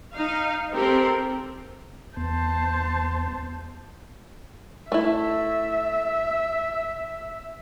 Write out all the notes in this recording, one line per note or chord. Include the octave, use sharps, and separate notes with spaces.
D#4 F5
C4 G4 A4 A#4
E2 B3 C5 A5
A3 E4 E5